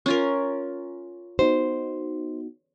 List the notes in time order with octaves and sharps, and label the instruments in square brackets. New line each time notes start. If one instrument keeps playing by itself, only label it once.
[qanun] C#4 F4 A#4
[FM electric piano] B3 D#4 F#4 [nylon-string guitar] C5